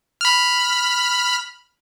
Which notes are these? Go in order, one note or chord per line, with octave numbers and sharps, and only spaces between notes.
B5 F6